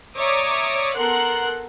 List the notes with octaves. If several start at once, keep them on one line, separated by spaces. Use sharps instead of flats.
C#5 D5 E5 A#5 D6 D#6
B3 A4 A#4 F#5 C6 F#6